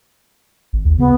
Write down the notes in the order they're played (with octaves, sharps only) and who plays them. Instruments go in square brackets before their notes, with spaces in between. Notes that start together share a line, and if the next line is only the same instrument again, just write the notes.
[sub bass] G#1
D#2
[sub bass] C#3 [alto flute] B3